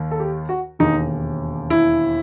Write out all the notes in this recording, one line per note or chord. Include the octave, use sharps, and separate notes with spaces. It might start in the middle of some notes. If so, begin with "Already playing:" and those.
Already playing: D#2 D#3
A4
G4
F#4
E1 D#2 D#3 D#4
E4